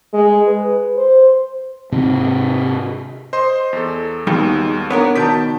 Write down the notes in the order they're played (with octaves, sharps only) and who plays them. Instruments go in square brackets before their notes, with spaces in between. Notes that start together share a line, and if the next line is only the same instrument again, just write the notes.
[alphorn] G#3
B4
C5
[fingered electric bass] G#2 C3 C4
[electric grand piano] C5 D#5 C6
E2 A4
[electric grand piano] D#2 B2 [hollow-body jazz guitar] G3 G#3 D#4
[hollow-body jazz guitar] B3 D4 A#4 [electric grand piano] C#5
[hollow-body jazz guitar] B2 D#3 D5 [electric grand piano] A5 G6 B6